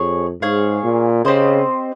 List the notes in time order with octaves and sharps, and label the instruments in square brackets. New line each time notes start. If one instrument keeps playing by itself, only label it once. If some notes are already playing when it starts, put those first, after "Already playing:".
Already playing: [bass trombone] F2 [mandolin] G#4 C#5
[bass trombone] G#2 [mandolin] G#4 C#5 F5
[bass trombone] A#2
[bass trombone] C#3 [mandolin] C4 G4 C5 D#5